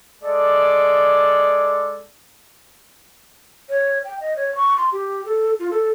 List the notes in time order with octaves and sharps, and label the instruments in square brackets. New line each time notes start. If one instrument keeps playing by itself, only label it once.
[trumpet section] G#3 A4 D5
[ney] C#5
G5
D#5
C#5
C#6
C6
G4
A4
F4
A4